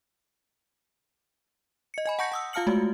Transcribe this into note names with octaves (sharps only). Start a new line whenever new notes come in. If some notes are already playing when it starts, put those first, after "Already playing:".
D#5 C#7
D#5 G#5 B5
F#5 A5 C#6 G6 A#6 C#7
F#5 D#6 E6
F4 F5 A5 F6 C#7 F#7
G#3 A3 F4 F#4